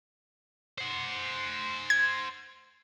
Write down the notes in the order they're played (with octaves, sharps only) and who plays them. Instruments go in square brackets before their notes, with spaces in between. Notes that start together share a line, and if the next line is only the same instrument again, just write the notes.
[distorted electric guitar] C5 F#5
[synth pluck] G#6